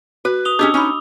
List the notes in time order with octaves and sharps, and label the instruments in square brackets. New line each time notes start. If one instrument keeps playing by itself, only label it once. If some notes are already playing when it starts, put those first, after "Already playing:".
[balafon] F#4 [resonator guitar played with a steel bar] B4
[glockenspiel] D#6 F7 G7
[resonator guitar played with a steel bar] C#4 G4 G#4 [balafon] D4 D#5 [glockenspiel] D6 E6
[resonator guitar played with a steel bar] C#4 D#4 [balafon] B5 C#6